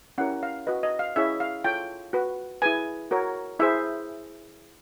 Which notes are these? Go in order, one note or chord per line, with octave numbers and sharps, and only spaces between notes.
C#4 E4 G4 A#4 F#5
F5
F#4 B4 D#5
D#5
F5
C#4 E4 G#4 C#5 E5
F5
F4 A4 C#5 G5
F#4 B4
E4 G#4 B4 G#5
F#4 A#4 C#5
E4 G#4 C5 E5